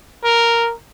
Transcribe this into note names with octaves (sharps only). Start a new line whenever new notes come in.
A#4